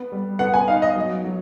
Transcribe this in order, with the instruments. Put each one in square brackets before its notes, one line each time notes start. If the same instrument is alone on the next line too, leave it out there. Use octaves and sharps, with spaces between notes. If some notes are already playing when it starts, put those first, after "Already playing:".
Already playing: [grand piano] B3
G3
[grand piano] B3 [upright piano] F#5
[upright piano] G#5
[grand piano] D#4 [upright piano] F5
[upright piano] D#5
[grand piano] F#3
F#3